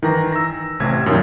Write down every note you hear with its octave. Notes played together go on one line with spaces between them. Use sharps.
D#3 E3 A#5 A#6
E6 A#6
A1 C3 G#6
F#2 A#2 D#3